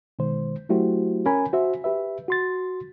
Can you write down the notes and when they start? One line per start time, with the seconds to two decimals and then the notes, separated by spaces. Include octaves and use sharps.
0.19 B2 D#3 G#3 C5
0.69 F#3 A3 E4 F#4 G4 C5
1.26 C#4 A#4 G#5 B5
1.53 F#4 C5 E5
1.84 G4 B4 E5
2.28 F#4 C6 A6